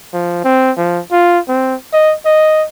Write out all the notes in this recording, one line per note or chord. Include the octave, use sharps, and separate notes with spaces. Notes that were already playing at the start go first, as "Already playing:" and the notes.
F3
C4
F3
F4
C4
D#5
D#5